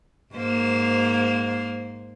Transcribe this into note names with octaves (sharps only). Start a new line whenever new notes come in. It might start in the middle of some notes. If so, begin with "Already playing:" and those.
G#2 A#3 C5